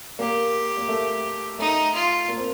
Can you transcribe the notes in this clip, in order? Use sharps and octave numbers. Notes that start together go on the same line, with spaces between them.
A#3 G4
A#3
A3
A3 D#4
F4
A#3
C4